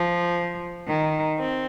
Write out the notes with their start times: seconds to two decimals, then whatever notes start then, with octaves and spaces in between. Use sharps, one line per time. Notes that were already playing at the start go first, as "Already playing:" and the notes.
Already playing: F3
0.87 D#3
1.37 C4